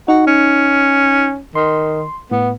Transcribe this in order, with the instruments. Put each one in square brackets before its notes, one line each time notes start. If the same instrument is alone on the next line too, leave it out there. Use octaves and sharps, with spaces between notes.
[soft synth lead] D#4 [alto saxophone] F#4
[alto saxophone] C#4
[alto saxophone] D#3 [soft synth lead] C6
[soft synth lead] A2 [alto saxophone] B3